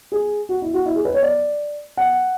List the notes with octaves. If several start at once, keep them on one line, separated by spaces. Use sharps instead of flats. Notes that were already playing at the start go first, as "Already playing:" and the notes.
G#4
F#4
E4
F#4
E4
G#4
B4
C#5
D5
F#5